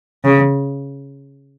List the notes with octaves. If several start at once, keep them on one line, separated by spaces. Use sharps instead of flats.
C#3